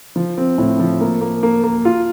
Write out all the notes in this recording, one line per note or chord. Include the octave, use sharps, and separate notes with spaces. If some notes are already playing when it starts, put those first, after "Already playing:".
F3
C4
A2
F3
A#3
A#3
A#3
A#3
F4